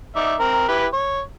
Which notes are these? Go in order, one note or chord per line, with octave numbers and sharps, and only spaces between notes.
D#4 D5 E5
C4 A#4
E4 G4 B4
C#5